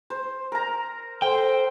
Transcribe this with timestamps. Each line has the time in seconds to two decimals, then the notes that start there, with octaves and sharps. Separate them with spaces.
0.10 C5
0.52 A#4 A#5
1.22 A4 C5 G5